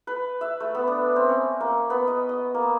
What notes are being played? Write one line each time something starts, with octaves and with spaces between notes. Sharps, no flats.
B4
E5
A3
B3
D4
C4
C#4
A#3
B3
D#5
D#5
A#3